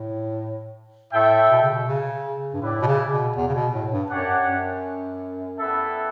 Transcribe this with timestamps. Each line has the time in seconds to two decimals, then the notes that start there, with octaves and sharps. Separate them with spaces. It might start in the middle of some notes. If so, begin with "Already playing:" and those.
Already playing: A2
1.13 A2 A3 E4 A4 E5 G5
1.50 B2
1.62 C#3
1.74 B2
1.87 C#3
2.53 G2
2.62 A2 E4 B4 D5 G5
2.82 B2
2.86 C#3
3.12 B2
3.36 E2
3.48 C#3
3.55 B2
3.73 A2
3.92 G2
4.10 F#2 D4 G4 C#5 F#5
4.48 F#2
5.59 G3 B3 E4 A4 E5